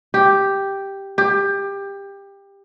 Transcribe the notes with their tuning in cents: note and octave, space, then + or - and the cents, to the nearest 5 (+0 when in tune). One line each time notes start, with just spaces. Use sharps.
G4 +0
G4 +20